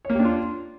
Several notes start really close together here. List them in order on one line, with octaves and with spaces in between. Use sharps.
C#5 A#3 G4 D4 F4